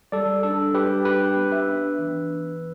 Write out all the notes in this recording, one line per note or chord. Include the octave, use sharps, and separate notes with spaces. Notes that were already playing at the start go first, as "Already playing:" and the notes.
G3 A4 D5
D4 A4
G3 G4 B4
D4 G4 B4
B3
B4 E5
D4
E3
B3